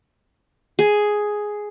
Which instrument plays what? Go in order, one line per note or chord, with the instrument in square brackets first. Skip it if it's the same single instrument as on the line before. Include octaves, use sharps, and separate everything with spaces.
[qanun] G#4